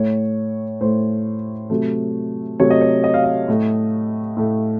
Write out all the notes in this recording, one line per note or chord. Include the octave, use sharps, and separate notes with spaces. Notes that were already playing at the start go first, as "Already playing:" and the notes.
Already playing: A2 A3 C#5
A2 A3 C5
C3 F#3 A3
C3 F#3 A3 C#5
D#5
C#5
D#5
F5
D#5
A2 A3
A2 A3